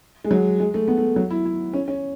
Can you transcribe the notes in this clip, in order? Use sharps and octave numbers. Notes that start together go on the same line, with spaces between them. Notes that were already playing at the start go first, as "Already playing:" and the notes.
G#3
F#3
G#3
A3
B3
A3
F#3
E4
E4
C#4
C#4